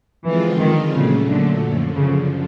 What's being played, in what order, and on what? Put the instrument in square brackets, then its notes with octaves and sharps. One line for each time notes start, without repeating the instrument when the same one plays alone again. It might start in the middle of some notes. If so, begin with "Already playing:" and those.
[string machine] D3 F3 G#3 C4 F4 [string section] E3
[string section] D#3
[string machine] A#2 F#3 A3 [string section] C#3
[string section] D3
[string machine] F#2 D3 F3
[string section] C#3